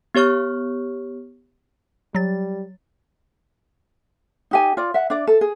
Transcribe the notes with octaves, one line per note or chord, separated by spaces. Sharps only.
B3 G4 C#5 C#6 F6
F#3 G3 A6
D#4 G4 G#5
F4 D5
E5 F#5
D4 D5
A4
G#4